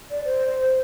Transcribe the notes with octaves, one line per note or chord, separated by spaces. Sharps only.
D5
C5